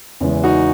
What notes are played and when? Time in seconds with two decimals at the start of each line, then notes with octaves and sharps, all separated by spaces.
0.21 E2 C#3 E3 G#3
0.44 D#4 F#4